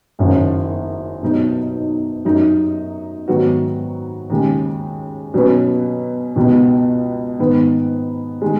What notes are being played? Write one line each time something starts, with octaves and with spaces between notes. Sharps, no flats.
F#1 F#2 D#3 F#3 C#4
B1 B2 F#3 D#4
F#2 F#3 D#4
G#2 D#3 F#3 B3 F#4
D#2 C#3 G#3
B2 F#3 C#4 B4
C#2 B2 B3
G#2 D#3 B3
D#3 G#3